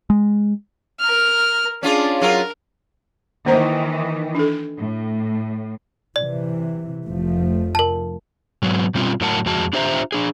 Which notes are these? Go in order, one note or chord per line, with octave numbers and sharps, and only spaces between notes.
G#3
A#4 F6
C#4 D4 F4 G#4
F#3 F4 A#4
D#3 E3 A#3 C5 A#5
D4 A4
A2
C3 E3 D5
F1 F3 A3
A#4 A5
G#2 F#3 B3
B2 G3 C4 C#4 F4
A2 F#3 A#4 F#5 A5
F2 G#3 F#4 A5
D4 F4 G4 C5 E5 A#5
D4 G#4